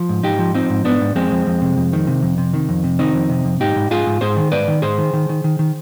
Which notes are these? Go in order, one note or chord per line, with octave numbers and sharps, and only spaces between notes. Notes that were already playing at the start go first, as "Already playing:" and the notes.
Already playing: F3
G#2
G#2 D#4 G4
F3
F3 C4 D#4
G#2
G#2 B3 D4
G#2
F2 G#3 C4
F2
F2
C3
F2
D#3
C3
F2
C3
D#3
F2
C3
D#3 C4 D#4
F2
C3
F2
G#2 D#4 G4
G#2
G#2 F4 G#4
G#2
G#2 G#4 C5
D#3
G#2 B4 D5
D#3
G#2 G#4 C5
D#3
D#3
D#3
D#3
D#3